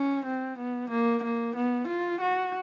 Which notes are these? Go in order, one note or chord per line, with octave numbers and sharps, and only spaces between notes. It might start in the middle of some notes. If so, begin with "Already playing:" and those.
Already playing: C#4
C4
B3
A#3
A#3
B3
F4
F#4